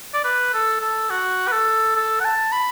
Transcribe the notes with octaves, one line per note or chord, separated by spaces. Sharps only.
D5
B4
A4
A4
F#4
B4
A4
A4
F#5
A5
B5